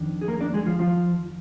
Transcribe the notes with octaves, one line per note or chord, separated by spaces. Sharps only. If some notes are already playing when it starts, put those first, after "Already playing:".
Already playing: F2 D#3 D4
G#4
A#3 A#4
D4 D5
G#3 G#4
F3 F4
F3 F4